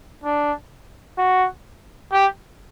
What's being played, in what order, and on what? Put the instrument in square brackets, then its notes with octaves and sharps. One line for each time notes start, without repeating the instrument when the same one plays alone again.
[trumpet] D4
F#4
G4